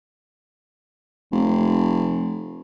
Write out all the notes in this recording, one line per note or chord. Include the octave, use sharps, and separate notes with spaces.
F1